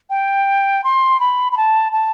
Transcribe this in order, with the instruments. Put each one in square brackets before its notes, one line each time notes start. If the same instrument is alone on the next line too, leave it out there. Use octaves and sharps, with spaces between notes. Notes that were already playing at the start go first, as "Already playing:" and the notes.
[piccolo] G5
C6
B5
B5
A5
A5